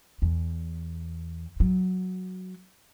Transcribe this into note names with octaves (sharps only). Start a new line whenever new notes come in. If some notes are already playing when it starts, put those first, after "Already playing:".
E2
F#3